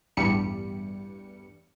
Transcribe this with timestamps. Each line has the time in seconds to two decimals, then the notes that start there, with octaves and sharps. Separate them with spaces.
0.17 A1 E2 G2 G3 C#7